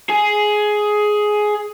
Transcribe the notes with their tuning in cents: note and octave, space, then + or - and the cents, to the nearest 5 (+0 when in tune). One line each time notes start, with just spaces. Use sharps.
G#4 +10